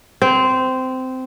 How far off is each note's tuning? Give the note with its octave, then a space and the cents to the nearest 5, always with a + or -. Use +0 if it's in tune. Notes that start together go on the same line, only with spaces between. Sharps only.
C4 -15